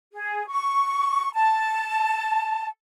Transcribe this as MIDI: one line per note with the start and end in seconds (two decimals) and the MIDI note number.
0.12 0.45 68
0.48 1.30 85
1.34 2.68 81